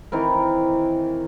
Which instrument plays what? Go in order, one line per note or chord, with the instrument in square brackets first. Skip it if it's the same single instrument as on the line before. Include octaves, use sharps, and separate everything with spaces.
[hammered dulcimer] D#3 E3 C4 A#4